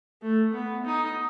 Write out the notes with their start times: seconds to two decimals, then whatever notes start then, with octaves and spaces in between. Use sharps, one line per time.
0.22 A3
0.53 B3
0.85 D#4